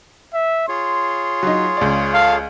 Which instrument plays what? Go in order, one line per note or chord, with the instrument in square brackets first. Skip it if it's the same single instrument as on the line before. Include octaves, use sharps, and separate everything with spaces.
[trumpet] E5
[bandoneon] F4 G#4 C#5 [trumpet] C6
[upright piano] F#3 D#4
C#2 D5
[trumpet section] A4 F5